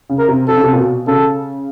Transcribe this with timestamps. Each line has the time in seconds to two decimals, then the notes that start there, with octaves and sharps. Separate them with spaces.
0.10 C#3
0.19 A#4
0.28 C3
0.48 C3 A4
0.56 C#3
0.63 C3
0.73 A#2
0.78 B2
1.07 C#3 A4